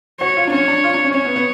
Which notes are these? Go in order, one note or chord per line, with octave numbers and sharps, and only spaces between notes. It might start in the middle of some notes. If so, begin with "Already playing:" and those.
F#4 C#5
F4
D4
C#4 C#5
D4
F4
D4
C#4
C#4 C#5
B3
B3